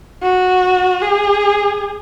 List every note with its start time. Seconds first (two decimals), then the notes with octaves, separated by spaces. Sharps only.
0.22 F#4
1.02 G#4